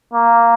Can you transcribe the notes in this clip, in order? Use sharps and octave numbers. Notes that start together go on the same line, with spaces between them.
A#3